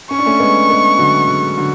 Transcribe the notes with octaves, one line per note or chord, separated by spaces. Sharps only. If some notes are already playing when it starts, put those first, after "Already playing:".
C#4 C#6
D4
A3 C#4
G#3 B3
G#3 B3
D3 F#3
D3 F#3
D3 F#3